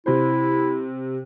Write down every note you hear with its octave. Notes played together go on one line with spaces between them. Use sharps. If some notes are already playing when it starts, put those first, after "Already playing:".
C3 E4 C5